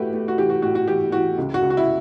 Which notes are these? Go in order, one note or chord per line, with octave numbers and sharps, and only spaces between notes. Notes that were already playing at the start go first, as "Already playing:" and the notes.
Already playing: A2 A3 F#4 G4 B4
A3
F#4
E3 G4
F#4
A2 F#4
F#4
E3 G4
E3 F#4
C#2
F#4
C#2
F#4
E4